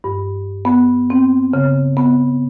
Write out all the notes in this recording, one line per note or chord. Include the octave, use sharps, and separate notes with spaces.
G2
B3
C4
C#3
B3